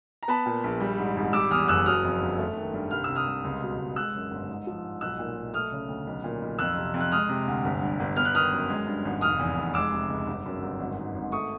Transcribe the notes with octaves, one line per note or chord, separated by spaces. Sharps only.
A#5
B3 A5 B5
A#2
A#1
G3
G#2
G#1
G3 D6 E6
E2 D#6 F6
F#1 E6 F#6
F#3 D#6 F6
F2
G1
A3
D#3
G2
C2 F6
C3 E6
D#6 F6
C2
C#2
B2
C#2
G#3 E6 F#6
F#2
G1
G#2
F3
G#2
B1 E6 F#6
A#2
B1
A3 D#6 F6
C#3
D2
B1
A#2
B1
F2 E6 F#6
C3
F2
F#6
G#3 D#6 F6
C3
D2
G1
G2
G1
B3 F6
F#6
D#3 D#6 F6
F#2
G#3
G2
G#1
F1 D#6 F6
E2
F1
G#3 D6 E6
C3
C#2
G1
F#2
G1
G#1
G#2
G#1
A3 C#6 D#6